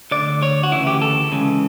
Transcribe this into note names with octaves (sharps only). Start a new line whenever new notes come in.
D2 D3 D5
C#5
F#4
D2 C#3 E3 E4
G4
A4
C#2 C#3 E3